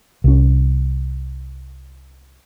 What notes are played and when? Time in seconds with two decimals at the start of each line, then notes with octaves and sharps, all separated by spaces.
0.24 C2 C#4